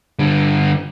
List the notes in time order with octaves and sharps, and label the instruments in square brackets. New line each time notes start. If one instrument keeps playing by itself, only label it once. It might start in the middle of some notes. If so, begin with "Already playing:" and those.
[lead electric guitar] D3 G3